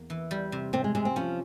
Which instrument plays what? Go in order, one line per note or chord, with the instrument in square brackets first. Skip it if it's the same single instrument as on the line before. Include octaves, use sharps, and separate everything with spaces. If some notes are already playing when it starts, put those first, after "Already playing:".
Already playing: [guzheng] E2 A#3
E3
G3
C3
[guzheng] C3 [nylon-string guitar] C4
[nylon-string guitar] G#3
[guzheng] C3 [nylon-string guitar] G#3
[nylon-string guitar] C4
[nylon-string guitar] F3 [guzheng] C#4